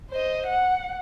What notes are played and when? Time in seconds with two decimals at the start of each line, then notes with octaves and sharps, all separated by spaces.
0.11 C5 D#5
0.46 F#5